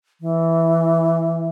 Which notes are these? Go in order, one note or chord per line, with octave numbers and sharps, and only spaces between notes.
E3